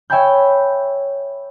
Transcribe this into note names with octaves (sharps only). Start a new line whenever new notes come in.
C#5 E5 G5 G#5 B5 G6